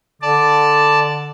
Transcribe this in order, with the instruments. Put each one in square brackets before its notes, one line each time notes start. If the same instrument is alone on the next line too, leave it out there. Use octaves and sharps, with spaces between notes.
[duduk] D3 [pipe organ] D5 A5